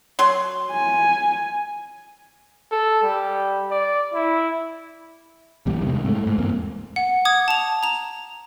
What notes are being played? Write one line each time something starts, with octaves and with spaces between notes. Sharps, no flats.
F#3 C6
G#5
A4
G3
D5
E4
B1 E2 G3
C#2 C3 D#3 G3
G#2 A3
G#2
E2 G2 A#3 C4
F#5
D6 D#6 G#6
A5 F7
A#5 F7